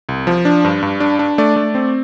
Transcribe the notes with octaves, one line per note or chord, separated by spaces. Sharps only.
C2
F3
D4
G2
G2
D4
D4
A3 D5
A3
C4